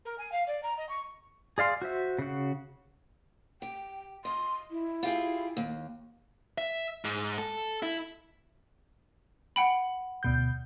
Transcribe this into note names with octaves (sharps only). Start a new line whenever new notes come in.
A#4
G#5
F5
D5
A#5
D#5
C#6
G#4 D5 F5 C6
F#4 C5 E5
C#3 F#4
G4 G5
D#5 C6
E4
F4 G4 G#4
D#2
E5
G#2
A4
E4
F#5 G5 B5
D2 B2 G6